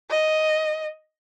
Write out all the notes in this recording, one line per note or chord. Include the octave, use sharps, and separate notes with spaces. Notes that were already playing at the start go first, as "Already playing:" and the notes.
D#5